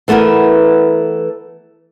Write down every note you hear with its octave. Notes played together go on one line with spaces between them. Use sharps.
E3 A3 B3 E4 A#4